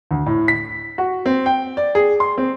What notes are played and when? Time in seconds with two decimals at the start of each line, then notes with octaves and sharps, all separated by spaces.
0.11 D2
0.26 A2
0.48 B6
0.98 F#4
1.26 C4
1.46 G5
1.77 D5
1.95 G#4
2.20 C6
2.38 C4